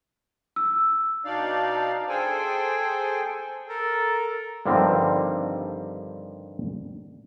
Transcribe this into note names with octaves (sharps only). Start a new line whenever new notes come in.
E6
B2 D4 D#4 D5 F5
G#4 A4 C5 G5 G#5
A4 A#4
G2 D3 D#3 F3 G3 C4